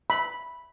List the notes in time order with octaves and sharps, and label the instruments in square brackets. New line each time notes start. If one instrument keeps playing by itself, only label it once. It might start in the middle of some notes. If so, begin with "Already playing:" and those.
[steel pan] B5